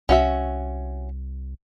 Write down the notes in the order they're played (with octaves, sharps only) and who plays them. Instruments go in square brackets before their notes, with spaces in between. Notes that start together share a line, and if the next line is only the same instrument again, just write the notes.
[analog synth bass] C2 [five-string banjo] C#4 F#4 E5